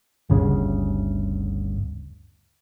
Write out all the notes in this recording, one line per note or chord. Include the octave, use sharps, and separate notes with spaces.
G1 D2 C#3